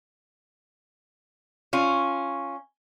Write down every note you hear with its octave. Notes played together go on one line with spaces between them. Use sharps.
C#4 F4